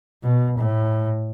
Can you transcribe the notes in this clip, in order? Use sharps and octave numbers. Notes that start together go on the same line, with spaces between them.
B2
A2